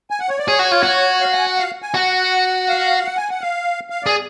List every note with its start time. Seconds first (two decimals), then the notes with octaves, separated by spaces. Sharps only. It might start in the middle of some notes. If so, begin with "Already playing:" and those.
0.10 G#5
0.20 F#5
0.29 C#5
0.38 D5
0.47 G#4 C#5
0.59 F#4
0.72 F4
0.83 F#4
1.21 F5
1.33 G#5
1.46 F#5
1.58 F5
1.82 G#5
1.94 F#4 F#5
2.68 F5
3.05 F#5
3.17 G#5
3.29 F#5
3.41 F5
3.90 F5
4.03 G#4 D5